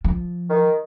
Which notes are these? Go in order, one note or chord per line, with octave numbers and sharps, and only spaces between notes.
F3
D#3